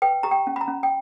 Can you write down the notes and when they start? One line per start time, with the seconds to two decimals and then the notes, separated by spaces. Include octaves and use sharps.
0.02 B4 G5
0.23 G4 A#5
0.31 G5
0.47 C#4
0.56 B5
0.61 A#5
0.68 C#4
0.83 G5